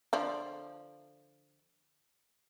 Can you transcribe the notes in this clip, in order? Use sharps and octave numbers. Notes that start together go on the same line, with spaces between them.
D3 F3 D5